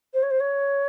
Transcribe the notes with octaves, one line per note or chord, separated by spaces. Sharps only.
C5
C#5
C5
C#5